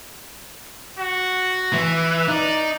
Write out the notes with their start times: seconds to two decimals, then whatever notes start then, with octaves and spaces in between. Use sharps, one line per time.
0.99 F#4
1.73 E3
2.28 D#4 D5